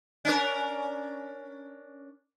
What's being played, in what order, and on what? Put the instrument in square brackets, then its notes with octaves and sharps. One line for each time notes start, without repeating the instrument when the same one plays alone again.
[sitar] C#4 D4 A#4